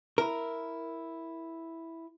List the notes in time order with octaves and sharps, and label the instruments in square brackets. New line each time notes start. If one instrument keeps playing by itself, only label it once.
[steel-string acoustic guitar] E4 [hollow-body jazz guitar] A#4